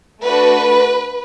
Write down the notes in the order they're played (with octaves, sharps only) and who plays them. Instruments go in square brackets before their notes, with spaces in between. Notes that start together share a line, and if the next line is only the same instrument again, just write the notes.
[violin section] A3 D4 F#4 B4